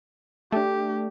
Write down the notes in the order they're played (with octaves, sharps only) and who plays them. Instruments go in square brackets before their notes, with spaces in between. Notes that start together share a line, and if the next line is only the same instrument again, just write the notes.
[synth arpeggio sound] A3 D4 [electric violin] G4